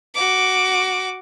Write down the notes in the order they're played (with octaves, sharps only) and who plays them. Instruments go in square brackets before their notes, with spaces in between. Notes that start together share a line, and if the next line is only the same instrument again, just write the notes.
[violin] F#4 D6